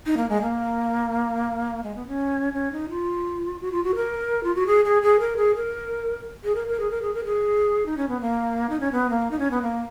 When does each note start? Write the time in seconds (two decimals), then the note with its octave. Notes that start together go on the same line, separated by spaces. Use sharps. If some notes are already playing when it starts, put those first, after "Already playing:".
0.06 D#4
0.17 A#3
0.29 G#3
0.42 A#3
1.84 G#3
1.95 B3
2.07 C#4
2.53 C#4
2.72 D#4
2.90 F4
3.60 F#4
3.72 F4
3.84 F#4
3.95 A#4
4.44 F4
4.55 F#4
4.67 G#4
4.85 G#4
5.02 G#4
5.20 A#4
5.37 G#4
5.55 A#4
6.44 G#4
6.55 A#4
6.68 A#4
6.80 G#4
6.90 A#4
7.02 G#4
7.14 A#4
7.25 G#4
7.86 D#4
7.97 C#4
8.09 B3
8.21 A#3
8.69 D#4
8.80 C#4
8.92 B3
9.10 A#3
9.31 D#4
9.39 C#4
9.51 B3
9.62 A#3